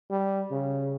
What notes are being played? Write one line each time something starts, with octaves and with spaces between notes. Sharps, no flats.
G3
C#3